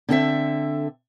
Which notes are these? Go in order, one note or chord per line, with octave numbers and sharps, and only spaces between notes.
D3 C4 A4 E5